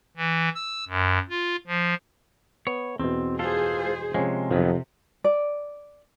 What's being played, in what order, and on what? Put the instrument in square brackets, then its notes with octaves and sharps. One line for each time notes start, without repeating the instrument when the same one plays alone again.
[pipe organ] E3
E6
F#2
F4
F3
[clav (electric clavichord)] B3 [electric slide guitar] C#5
[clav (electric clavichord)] E2 B2 [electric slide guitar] C4
[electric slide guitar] F4 A4 [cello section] G#4 C5
[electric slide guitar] C3 G#3 [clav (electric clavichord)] F3 C#4
[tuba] F2 [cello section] C3 [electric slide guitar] D#3 F#3 B3
[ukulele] D5